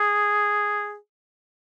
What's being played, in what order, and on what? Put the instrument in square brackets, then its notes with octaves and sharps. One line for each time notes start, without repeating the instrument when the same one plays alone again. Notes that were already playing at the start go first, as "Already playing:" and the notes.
Already playing: [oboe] G#4